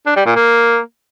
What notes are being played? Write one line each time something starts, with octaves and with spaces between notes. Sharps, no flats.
D4
G3
A#2
A#3